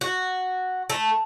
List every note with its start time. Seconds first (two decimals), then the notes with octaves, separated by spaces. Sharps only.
0.01 F#4
0.90 A3